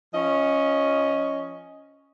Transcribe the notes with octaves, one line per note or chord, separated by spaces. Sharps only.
F3 C#4 D#5